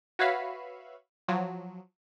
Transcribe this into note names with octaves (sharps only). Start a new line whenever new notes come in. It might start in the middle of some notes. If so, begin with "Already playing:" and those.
F#4 B4 C#5 E5 F5 B5
F3 F#3